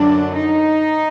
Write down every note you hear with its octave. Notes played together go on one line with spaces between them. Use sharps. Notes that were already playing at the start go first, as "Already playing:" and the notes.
Already playing: F#2 D3 F#3 D4
D#4